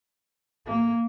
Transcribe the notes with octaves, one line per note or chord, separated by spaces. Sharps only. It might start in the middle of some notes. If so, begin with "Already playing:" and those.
A#3